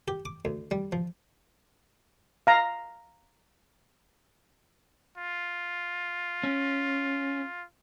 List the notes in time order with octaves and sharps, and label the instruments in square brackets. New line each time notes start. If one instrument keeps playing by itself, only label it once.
[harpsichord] G4
D6
D2
G3
F3
[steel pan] F5 A#5
[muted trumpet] F4
[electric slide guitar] C#4